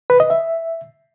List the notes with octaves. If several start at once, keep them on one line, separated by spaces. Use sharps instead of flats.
B4
D#5
E5